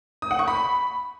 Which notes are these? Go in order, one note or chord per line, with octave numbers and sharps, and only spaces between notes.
D#6
F#5
C#6
B5